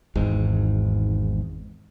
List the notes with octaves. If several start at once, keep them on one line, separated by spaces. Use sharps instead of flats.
G#1 E2 G#2